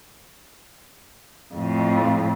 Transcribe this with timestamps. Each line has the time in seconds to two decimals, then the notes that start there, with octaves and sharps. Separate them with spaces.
1.54 F2 A2